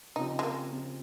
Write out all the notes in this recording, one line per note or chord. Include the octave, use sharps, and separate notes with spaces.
C#3 F3 C4 D#4 G4
G#3
A#3
C#3 F3 C4 G4